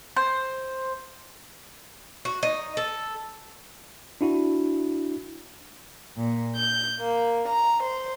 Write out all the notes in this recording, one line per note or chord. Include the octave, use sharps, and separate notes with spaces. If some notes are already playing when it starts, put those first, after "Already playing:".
C5
F#4
D#4
A4
D4 E4 F#4
A#2
G6
A#3
A#5
C5